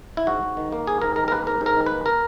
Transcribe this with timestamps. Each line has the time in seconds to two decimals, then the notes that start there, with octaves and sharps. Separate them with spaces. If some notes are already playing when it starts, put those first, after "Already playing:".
0.17 E4
0.27 G#2 F#4
0.43 G#2
0.57 D#3
0.72 A#3
0.87 G#2 G#4
1.02 G#2 A#4
1.16 D#3 A#4
1.28 A#4
1.31 A#3 B4
1.47 G#2 A#4
1.61 G#2
1.66 A#4
1.76 D#3
1.86 B4
1.92 A#3
2.06 A#4